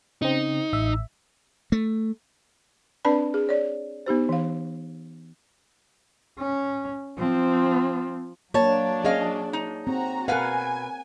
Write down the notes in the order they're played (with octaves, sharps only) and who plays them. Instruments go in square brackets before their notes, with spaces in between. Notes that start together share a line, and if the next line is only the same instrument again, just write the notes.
[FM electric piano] C#3 C4 [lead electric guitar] D#4
[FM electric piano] A1 E5
[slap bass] A3
[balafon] C4 D4 B4 D5 A5 B5
G#4
C#5 D5
B3 D#4 G4 C5
E3 F5
[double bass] C#4
[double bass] F3 [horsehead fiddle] C4
[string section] F#3 D4 [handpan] A#3 [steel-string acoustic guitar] C#5 A5
[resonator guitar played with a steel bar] C#4 D#5 F5 [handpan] G#4
[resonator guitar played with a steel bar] D#4
[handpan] C4 [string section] F#4 A#5
[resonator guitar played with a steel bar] B2 B4 F5 [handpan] A#4 F#5 [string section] G#5